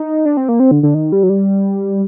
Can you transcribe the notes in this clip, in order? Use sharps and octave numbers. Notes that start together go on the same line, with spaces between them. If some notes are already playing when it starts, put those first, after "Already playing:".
Already playing: D#4
D4
C4
A#3
C4
D3
D3
D#3
G3
F#3
G3